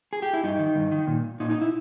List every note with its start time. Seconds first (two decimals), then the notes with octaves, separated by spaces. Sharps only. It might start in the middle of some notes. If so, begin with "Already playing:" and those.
0.13 G#4
0.22 G4
0.33 E4
0.43 G2 D#4
0.59 D#3
0.76 G2
0.92 D#3
1.07 A#2
1.40 A#2 D#4
1.50 D#4
1.62 E4